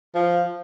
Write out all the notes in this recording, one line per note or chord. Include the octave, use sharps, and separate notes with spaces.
F3